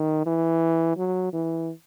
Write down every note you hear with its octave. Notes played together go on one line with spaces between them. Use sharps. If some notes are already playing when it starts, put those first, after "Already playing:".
Already playing: D#3
E3
F#3
E3